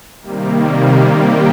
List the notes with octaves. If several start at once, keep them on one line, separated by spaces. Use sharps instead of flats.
C3 D#3 G3 A#3
G4 G5